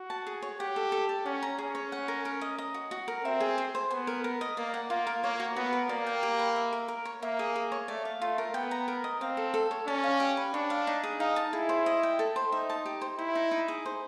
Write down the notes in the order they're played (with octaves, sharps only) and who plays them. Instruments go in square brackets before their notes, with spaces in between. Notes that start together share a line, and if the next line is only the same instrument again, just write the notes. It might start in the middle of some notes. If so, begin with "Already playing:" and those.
Already playing: [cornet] F#4
[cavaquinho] A5
G#4
C#5
[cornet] G4 [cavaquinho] F#5
[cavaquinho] A4
A4
D5
[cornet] C#4 [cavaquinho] F#5
[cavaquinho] A#5
[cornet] C#4 [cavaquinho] G#4
[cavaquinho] C#5
F#5
A#4
A#4
D#5
D#5
F#4
F#4
A#4
[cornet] C4 [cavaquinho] E5
[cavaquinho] G#4
G#4
C5
[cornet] B3 [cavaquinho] G#5
[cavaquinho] A#4
A#4
D#5
[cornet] A#3 [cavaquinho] D5
[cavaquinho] F#5
[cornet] A#3 [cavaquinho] F4
[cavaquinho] A#4
[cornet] A#3 [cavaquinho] C#5
[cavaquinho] F#4
[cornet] B3 [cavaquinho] F#4
[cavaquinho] A#4
[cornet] A#3 [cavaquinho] D5
[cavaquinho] G5
G4
B4
E5
A#4
A#4
C#5
[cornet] A#3 [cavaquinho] E5
[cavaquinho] G#4
G#4
C#5
[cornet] A3 [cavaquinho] D5
[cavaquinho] F5
[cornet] A3 [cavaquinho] F4
[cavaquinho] A#4
[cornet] B3 [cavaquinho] G5
[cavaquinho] A#5
A#4
D#5
[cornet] C4 [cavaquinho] F5
[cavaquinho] A4
A4
C#5
[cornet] C#4 [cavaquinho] D5
[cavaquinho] F5
G4
B4
[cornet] D4 [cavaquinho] C#5
[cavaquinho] F5
D#4
G#4
[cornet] D#4 [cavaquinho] F5
[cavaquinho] A5
[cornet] E4 [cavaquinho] G#4
[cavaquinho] C5
D#5
G5
A4
C5
[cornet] D#4 [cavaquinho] E5
[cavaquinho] A5
G4
C5
[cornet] E4 [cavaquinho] C5
[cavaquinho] D#4
D#4
G#4
C5